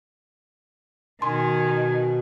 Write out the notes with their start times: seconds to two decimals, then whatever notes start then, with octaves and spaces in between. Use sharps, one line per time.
1.22 B2 D#3 G#5 C6